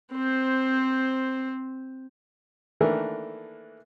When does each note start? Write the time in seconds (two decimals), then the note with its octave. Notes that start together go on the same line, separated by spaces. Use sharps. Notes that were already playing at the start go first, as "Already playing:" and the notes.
0.13 C4 C5
2.81 D#3 E3 A3 A#3 D4 A#4